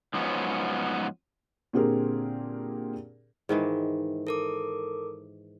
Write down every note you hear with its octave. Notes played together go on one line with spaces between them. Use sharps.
G#2 F3 F#3 B3 C#4
A#2 D3 C4 G4 G#4 A#4
G#2 D#3 E3
A4 A#4 D6